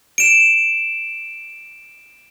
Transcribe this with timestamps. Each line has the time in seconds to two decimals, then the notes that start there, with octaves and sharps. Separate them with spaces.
0.18 D7 E7